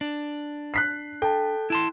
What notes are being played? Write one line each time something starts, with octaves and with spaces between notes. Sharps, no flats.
D4
F#6 B6 C7
A4 G5 A5
E4 A5 C6